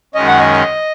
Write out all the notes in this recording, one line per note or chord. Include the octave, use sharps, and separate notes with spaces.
F#2 D#3 G#3 C#4 D#5
F#5
D#5